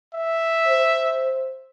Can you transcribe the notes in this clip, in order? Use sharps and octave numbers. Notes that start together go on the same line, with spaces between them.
E5
C5